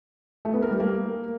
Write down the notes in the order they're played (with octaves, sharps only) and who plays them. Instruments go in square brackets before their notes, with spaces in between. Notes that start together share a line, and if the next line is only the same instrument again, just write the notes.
[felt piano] A3
B3
A#4
G3
A#3